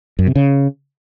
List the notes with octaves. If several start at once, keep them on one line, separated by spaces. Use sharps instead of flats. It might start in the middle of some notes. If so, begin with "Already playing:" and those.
F#2
C3
C#3